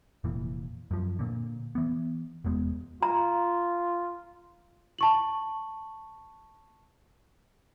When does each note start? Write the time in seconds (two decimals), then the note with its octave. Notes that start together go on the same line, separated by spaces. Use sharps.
0.24 F1 A#2 E3
0.91 F#2 F3
1.19 A#2 D3
1.75 E3 B3
2.44 F1 E2 G#3 B3
3.03 F4 A#5
4.99 A5 C#6 F#7